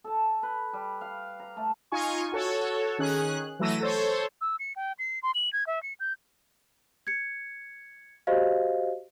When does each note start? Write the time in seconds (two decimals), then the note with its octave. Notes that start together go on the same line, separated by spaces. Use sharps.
0.04 A4 A5
0.43 B4
0.73 G3
1.01 F5
1.39 A#5
1.56 A3 A4
1.92 D#4 F4 G#5 C#6
2.32 F#4 A4 C#5
2.98 D#3 C#4 G#4 F#6
3.59 E3 F#3 A3 E6 A#6 D#7
3.81 A4 C5 C#5
4.41 E6
4.59 C#7
4.76 G5
4.99 C7
5.23 C6
5.35 F#7
5.53 G#6
5.67 E5
5.83 C#7
6.00 G6
7.07 G#6 C#7
8.27 F#4 G4 C5 D#5 F5